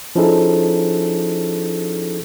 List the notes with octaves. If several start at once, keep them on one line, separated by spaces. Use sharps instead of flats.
F3 C#4 D#4 E4 G#4 A4